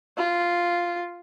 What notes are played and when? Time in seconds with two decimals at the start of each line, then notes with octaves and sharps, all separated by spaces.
0.17 F4